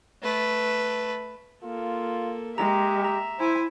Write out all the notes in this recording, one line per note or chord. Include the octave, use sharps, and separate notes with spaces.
A3 B4
A#3 F4 A4
G#3 G4 E5 A#5
A#5
E4 C5 G#5